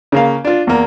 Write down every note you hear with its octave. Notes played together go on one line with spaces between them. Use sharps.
C#3 A#3 F5
D4 F4
E2 A#3